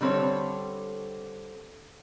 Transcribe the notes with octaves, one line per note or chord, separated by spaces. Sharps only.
D3 G3 C4 A4 C#5